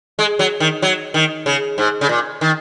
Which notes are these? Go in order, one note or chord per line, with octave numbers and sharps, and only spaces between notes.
G#3
F#3
D#3
F#3
D#3
C#3
G#2
C#3
A#2
D#3